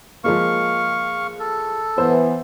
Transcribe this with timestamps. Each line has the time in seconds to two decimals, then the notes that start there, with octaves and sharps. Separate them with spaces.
0.24 F3 G#3 A#3 F5 C#6
1.39 A4
1.98 E3 B3 C5 E6